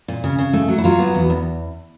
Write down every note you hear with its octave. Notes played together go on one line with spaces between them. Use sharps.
A#2
C#3
C#3
A3
F#3
E4
F#3 F4
B3
E2
E2